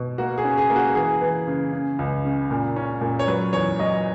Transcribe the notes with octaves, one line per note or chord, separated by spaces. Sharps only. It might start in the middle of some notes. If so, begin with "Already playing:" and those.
Already playing: B2
A#3 F#4
G#4
C#4
G#4
A#3
F#4
E3 G#4
E3
C#3
C#3
C#2
C#3
A#2
C#4
A#2
C#5
F#3 B4
E2 C#5
F#3 D#5